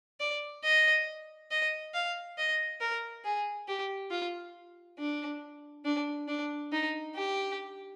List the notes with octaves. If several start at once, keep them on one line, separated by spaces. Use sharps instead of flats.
D5
D#5
D#5
F5
D#5
A#4
G#4
G4
F4
D4
D4
D4
D#4
G4